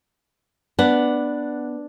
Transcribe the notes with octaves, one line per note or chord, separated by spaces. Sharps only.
B3 D4 F#5